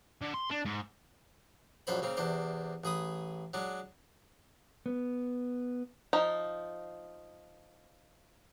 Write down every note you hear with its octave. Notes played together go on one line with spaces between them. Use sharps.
D3
C6
D4
G#2
A#1 F#2 A4 C5 C#5 B5
C#3 A#3 C4
E2 C3 D4 C5
A1 G#4 B5 D#6
F#3 G#3 D4
B3
F3 D#4